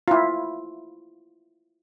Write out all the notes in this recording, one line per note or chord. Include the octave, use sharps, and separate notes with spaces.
E4 F4